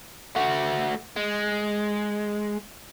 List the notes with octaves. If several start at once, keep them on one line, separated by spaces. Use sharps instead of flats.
A3 F#4
G#3